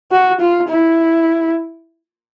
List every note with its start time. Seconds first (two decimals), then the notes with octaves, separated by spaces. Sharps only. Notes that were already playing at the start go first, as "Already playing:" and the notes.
0.11 F#4
0.40 F4
0.69 E4